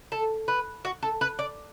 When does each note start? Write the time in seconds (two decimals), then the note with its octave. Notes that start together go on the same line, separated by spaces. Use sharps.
0.12 A4
0.48 B4
0.85 F#4
1.03 A4
1.21 B4
1.39 D5